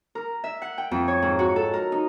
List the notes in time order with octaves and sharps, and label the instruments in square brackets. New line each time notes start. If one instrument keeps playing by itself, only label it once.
[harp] A#4
E5
F#5
G5
F2
C#5
G#2
F#4
A4
A#4
D#4